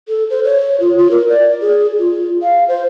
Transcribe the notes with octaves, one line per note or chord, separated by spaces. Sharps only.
A4
C5
C#5
F4
F4
A#4
D5
G#4
F4
F5
C5